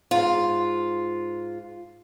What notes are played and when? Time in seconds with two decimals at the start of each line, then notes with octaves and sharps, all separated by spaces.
0.11 G#2 F4